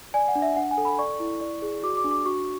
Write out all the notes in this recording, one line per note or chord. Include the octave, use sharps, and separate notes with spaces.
D5 G#5
F#5
D4
E5
D4 F#5
G#5
A4
B5
D5 C#6
E4
D5
G#4
F#4 D6
D6
D4
D6
F#4 C#6